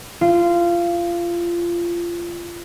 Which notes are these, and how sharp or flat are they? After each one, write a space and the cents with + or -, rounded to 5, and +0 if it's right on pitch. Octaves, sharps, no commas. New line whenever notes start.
F4 -20